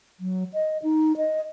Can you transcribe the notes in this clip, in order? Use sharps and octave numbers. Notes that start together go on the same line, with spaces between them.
F#3
D#5
D#4
D#5